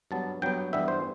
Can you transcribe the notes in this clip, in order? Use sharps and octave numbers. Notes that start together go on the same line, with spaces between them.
G2 F#3 B3 A5
G2 F#3 B3 G5
G2 E3 G3 B3 E4 E5
C5